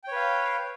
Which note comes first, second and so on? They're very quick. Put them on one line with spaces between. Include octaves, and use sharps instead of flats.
G5 C#5 B4 F5